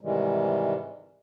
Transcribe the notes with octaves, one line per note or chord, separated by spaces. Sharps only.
G#2 C3 D#3 E3 G3 G#3